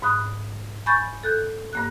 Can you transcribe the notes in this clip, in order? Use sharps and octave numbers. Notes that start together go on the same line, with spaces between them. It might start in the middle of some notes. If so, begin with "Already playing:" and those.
G#2 B5 D#6 F#6
G#5 B5 C#6 G6 A6
A4 F#6 G6
G2 A#3 F#6